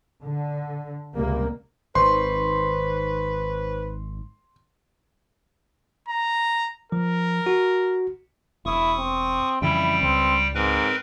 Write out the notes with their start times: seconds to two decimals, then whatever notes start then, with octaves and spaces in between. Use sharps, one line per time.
0.23 D3
1.16 C#2 C3 G3 A#3
1.95 G#1 D#3 B4 C5 C6 C#6
6.09 A#5
6.92 F3 A#4
7.46 F#4
8.66 E1 E4 C#6 D#6
8.98 C4
9.62 F2 C#3 E3 G3 E4 G5
10.02 C#2 C4
10.55 G#2 C4 A#4 B4